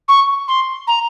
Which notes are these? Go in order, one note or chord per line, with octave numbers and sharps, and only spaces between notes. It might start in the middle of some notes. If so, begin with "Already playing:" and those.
C#6
C6
A#5